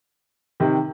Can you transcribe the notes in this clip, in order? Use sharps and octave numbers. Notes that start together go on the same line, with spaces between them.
C3 D#3